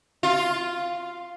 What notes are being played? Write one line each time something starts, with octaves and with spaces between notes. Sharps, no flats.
F4